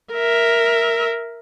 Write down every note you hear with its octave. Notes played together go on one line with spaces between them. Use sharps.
A#4 E5